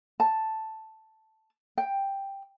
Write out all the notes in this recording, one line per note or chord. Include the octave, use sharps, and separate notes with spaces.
A5
G5